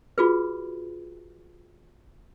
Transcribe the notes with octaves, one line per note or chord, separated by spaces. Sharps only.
F4 F#4 G#4 B4